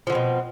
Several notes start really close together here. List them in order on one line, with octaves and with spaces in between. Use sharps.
F3 D3 C4 B2